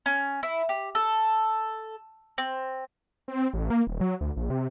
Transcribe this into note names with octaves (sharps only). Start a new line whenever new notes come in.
C#4
E4
G4
A4
C4
C4
A1
A#3
D#1
F#3
D2
A#1
C3